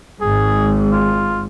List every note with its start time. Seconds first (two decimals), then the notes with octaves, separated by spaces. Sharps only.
0.21 G#1 G#2 G#4
0.92 F4